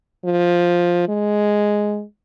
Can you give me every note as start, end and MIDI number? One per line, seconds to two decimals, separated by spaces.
0.24 1.06 53
1.08 2.03 56